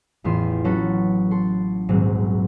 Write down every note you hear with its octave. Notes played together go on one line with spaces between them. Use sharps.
A1 E2 B3 F4 C6 E7
F#3 C#4 F#4 A4 B4
A4 C6
D#1 A#1 G#2 F#3 C4